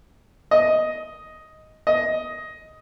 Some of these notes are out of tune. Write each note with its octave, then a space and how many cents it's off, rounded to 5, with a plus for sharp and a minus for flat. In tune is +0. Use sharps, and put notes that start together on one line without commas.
D#5 +5
D#5 +10